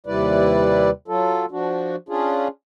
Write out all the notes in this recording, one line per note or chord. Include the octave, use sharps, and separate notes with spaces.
D#2 C3 G3 E4 B4 D5
F#3 F4 A4
F3 D4 F#4
C#4 D4 F4 G#4